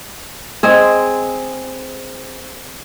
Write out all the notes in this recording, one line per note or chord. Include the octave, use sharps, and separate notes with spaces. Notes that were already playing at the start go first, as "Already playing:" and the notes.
G#3 C4 G#4